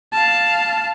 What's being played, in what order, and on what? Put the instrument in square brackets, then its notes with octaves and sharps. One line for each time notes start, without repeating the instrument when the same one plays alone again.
[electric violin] F5 A5